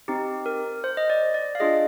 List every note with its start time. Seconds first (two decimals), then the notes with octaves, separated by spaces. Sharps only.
0.08 C4 D#4 G4
0.46 A#4
0.84 C5
0.97 D#5
1.10 D5
1.34 D5
1.55 F5
1.60 D4 F4 G#4 D#5